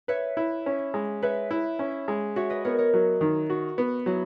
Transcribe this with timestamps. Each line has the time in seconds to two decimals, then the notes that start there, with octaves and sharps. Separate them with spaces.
0.08 B4 C#5 E5
0.37 E4
0.66 C#4
0.94 G#3
1.22 B4 C#5 E5
1.51 E4
1.79 C#4
2.08 G#3
2.36 F#4 C#5 E5
2.50 B4 D#5
2.64 B3 A#4 C#5
2.78 A#4 C#5
2.94 F#3
3.21 D#3
3.50 F#4
3.78 B3
4.06 F#3 E4 G#4